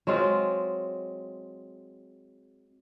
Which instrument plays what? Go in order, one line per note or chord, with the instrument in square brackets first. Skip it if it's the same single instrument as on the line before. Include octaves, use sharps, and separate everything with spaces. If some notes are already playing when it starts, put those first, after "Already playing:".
[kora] F#3 G#3 C4 F4